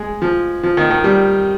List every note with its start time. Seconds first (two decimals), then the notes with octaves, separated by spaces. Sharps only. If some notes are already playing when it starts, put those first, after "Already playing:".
Already playing: G#3
0.22 F3
0.63 F3
0.77 D#3
0.90 D#3
1.04 G3